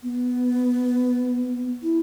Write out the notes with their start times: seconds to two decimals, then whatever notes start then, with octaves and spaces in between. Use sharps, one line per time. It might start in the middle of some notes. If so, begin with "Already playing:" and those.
0.03 B3
1.82 E4